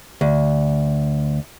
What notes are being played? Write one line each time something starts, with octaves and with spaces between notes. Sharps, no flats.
D2